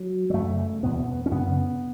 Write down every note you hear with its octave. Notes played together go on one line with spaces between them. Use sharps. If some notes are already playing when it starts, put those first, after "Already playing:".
Already playing: F#3
F#3
F#2 C#3 A3
E2 B2 B3
C#4
F#2 C#3 B3